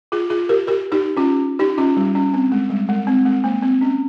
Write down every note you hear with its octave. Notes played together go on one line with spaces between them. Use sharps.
F4 G#4
F4 G#4
G4 A#4
G4 A#4
D#4 G4
C#4 F4
D#4 G4
C#4 F4
G3
C#4
C4
G#3
G3
G#3
C4
G#3
A#3
C4
C#4